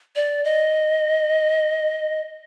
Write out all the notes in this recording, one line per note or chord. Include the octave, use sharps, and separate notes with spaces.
D5
D#5